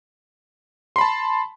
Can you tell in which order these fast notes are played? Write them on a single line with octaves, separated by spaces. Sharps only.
C6 B5 A5